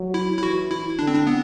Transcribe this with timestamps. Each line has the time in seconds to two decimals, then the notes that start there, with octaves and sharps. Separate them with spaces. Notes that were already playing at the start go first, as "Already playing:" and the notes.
Already playing: F#3
0.14 E4
0.38 E4
0.43 E3 F#4
0.71 E4
0.98 D3 D4
1.07 C4
1.15 D4
1.27 B3